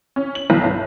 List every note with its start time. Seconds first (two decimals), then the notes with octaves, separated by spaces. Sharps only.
0.16 C#4
0.35 F#7
0.50 B1
0.63 G1